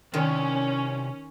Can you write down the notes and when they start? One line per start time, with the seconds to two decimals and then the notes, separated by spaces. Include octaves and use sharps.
0.14 C3 D#3 C#4 D5